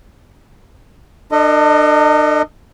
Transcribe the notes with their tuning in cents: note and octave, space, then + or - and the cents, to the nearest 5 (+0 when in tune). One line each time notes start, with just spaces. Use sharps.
D4 +35 A4 +40 D#5 +0